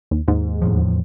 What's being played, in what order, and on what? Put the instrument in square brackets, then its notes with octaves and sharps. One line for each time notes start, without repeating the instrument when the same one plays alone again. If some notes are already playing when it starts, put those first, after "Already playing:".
[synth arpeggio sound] D#2
D#2 G#2
[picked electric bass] E2 A2 F3